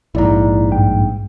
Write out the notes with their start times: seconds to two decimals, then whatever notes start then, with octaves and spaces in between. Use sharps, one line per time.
0.15 A#1 G#2 E4 D5 A#5
0.71 G2 G5